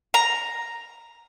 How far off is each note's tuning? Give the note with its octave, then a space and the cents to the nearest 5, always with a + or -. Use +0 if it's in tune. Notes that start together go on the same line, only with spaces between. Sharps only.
A#5 +0